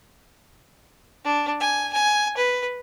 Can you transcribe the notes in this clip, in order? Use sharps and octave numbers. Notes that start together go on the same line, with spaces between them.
D4
G#5
G#5
B4